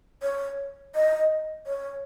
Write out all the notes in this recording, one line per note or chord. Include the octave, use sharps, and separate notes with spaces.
C#5
D#5
C#5